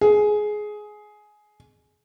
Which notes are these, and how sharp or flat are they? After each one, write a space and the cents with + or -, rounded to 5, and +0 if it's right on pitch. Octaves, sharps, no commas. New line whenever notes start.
G#4 +15